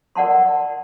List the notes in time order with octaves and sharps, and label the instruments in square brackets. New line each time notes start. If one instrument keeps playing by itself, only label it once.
[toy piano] A#4 D5 F#5 A5 C6